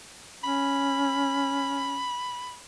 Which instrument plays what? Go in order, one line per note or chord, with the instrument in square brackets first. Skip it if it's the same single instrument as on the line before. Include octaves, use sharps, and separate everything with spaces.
[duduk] C#4 [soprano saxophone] B5